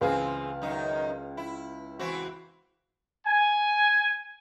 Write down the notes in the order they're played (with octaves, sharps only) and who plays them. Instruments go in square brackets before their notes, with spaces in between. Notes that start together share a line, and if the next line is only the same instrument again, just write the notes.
[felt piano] C#2 B4 F5 [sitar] E3 C4 G#4
[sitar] F#2 D#3 D#4
E4
E3 C4 F#4
[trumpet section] G#5